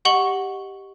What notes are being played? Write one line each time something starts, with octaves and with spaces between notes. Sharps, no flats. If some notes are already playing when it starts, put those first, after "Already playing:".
G4 D#5 F#5 C#6 F#7 G7